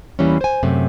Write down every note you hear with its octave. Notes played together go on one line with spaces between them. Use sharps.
E2 E3 G3 A#3 C#4
C5 G#5
F#2 C3 A3